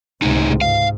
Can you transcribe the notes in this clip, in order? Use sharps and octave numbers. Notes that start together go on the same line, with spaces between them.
C#2 A2 C3 D#4
G#2 F5